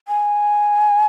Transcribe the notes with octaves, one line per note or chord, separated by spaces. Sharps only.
G#5